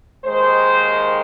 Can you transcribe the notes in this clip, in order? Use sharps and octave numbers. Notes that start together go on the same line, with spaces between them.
D#2 D#3 G#3 C5